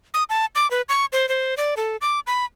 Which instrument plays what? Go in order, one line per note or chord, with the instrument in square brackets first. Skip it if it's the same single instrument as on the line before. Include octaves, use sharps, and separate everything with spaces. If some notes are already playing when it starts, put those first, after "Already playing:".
[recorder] D#6
A5
D6
B4
C#6
C5
C5
D5
A4
D6
B5